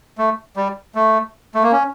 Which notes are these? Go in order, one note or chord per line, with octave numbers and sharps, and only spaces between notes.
A3
G3
A3
A3
A#3
C#4